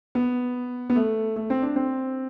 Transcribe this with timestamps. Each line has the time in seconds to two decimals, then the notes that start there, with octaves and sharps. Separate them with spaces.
0.15 B3
0.90 B3
0.96 A3
1.36 A3
1.50 C4
1.62 D4
1.76 C4